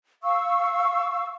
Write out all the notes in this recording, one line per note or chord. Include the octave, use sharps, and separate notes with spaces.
F5 C#6 E6